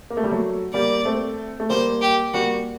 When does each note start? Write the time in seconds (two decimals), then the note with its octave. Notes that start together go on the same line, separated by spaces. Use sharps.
0.10 A#3
0.17 A3
0.24 G3
0.31 F#3 A3
0.74 G3 A#3 D5
1.05 A3 C4
1.60 A3
1.70 G3 A#3 C5
2.02 G4
2.34 G3 A#3 F#4